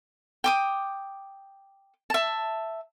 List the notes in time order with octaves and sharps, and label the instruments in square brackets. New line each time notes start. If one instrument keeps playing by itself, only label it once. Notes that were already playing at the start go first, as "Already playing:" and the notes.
[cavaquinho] G5 D6 D#6
E5 A5